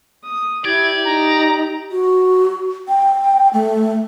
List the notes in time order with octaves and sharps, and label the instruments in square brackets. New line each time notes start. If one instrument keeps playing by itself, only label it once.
[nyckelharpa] D#6
[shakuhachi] E4 [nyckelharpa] G4 [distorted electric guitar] D5 [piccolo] G#6
[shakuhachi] D#4 [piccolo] A#5
[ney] F#4
G5
A3